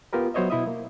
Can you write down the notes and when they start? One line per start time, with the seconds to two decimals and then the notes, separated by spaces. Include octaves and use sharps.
0.13 B3 F4 G4 A#4 B4
0.34 F#3 B3 C5 C#5 D#5 E5
0.50 B2 E4 D#5 E5 D#6
0.67 A#3